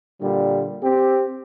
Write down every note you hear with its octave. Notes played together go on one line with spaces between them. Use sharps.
A#2 D3 G3
C4 G4